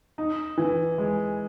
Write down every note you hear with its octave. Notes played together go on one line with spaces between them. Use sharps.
D#4
E3
G#3